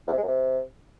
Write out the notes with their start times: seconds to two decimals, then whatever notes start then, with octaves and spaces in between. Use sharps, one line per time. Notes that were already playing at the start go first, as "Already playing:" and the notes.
0.07 E2
0.12 C3
0.17 G#3
0.22 F#2
0.28 C3